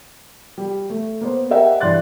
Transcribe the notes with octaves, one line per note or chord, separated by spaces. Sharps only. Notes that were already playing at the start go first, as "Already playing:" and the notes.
G3
A3
A#3 B3 C5
G4 A#4 D#5 E5 F#5 G5
G2 E3 D5 C6 F#6 A6